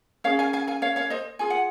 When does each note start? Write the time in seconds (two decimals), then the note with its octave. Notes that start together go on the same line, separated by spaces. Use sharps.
0.24 C#4 G#4 C#5 F5
0.39 F5 G#5
0.53 F5 G#5
0.67 F5 G#5
0.82 C#5 F5
0.96 C#5 F5
1.10 C5 D#5
1.39 F4 G#4 G#5
1.50 F#5